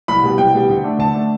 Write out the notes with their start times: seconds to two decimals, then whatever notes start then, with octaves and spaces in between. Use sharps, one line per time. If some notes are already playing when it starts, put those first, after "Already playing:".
0.08 C2 B5
0.23 B2 G3
0.38 C2 G5
0.53 B2 G3
0.69 D2
0.84 D3 A3 D4
0.99 D2 A5
1.14 D3 A3 D4